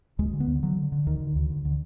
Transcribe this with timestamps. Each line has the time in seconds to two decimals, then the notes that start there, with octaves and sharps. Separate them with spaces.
0.19 D2 G#3
0.33 D3
0.40 B3
0.48 D3
0.63 D3 F#3
0.77 D3
0.92 D3
1.06 D2 D#3
1.20 D3
1.36 D2
1.50 D3
1.65 D3